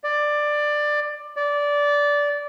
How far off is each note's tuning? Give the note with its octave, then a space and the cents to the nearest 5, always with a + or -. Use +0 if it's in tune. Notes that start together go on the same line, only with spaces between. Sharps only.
D5 +15
D5 -15